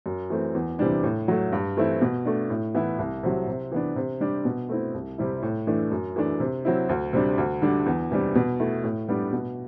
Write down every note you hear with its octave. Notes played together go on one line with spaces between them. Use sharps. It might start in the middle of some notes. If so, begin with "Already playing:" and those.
F#2
E3 A3 C4
E2
C3 E3 G3 D4
A2
F#3 A3
G2
E3 A3 C4 E4
B2
A3 D4
A2
E3 B3 E4
C2
C3 F#3
C3
E3 B3 D4
C3
G3 D4
B2
A3 C4 E4
C2
C3 G3 C4 E4
A2
E3 A3 D4
F#2
E3 A3 D4
C3
F#3 C4 E4
D2
C3 G3 D4
D2
D3 G3 D4
E2
C3 E3 G3 D4
B2
A3 E4
A2
G3 B3 D4
B2